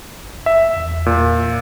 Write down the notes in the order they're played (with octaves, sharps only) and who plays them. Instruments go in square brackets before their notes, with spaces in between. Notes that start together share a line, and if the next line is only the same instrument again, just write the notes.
[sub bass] F#1
[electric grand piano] E5
[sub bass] E2
[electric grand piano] A#2